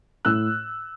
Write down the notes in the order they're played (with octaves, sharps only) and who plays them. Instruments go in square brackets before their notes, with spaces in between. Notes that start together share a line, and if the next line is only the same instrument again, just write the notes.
[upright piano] A2 E6 F#6